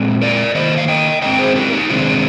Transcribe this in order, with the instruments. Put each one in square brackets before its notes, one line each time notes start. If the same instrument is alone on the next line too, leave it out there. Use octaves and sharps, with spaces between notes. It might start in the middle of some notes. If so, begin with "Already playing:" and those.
Already playing: [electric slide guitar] A#2 G#3 C4
A#4 D5
D#3 A#3 C5 D#5
F5
D#5 G5
D3 G#3 C4 D#5 G5
G#4 C5
G4 A#4
D#4 G4
C3 D#3 G#3 C4 D4 F4